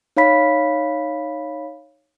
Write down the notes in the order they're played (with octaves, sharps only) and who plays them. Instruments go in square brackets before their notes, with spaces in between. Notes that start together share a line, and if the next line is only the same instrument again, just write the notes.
[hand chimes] D#4 C#5 F5 B5 B6